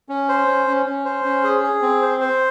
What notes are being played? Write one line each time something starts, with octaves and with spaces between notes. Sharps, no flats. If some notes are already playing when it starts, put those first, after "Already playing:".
C#4
C5
C#4
C#4
C#4
C5
C#4
G#4
G#4
C4
C5
C5